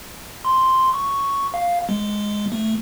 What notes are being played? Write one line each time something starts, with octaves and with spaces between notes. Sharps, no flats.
C6
C#6
F5
G#3
A3